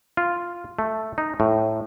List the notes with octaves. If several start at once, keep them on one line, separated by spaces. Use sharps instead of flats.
F4
A3
D#4
A2